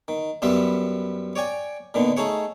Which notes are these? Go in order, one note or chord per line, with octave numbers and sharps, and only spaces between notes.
D#3
F#2 G3 B3 F4 E5 B5
C#5 D5 G5 G#5
A#2 D3 D#3 B3
A3 D#4 G#4 C#5 F#5